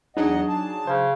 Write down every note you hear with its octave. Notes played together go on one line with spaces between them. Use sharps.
E2 F#3 D4 D#4 G#4 D#5 F#5
A5
C#3 C5